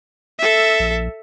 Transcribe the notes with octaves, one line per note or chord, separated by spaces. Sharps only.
A4 E5
A#1